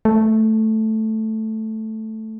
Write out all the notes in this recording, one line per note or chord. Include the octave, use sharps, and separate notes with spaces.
A3